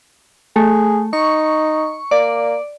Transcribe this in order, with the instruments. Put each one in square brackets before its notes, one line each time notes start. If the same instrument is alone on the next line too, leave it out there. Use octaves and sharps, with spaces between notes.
[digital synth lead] A3 [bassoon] G#4
[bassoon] D#4 [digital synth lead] C#6
[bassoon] A#3 [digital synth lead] D5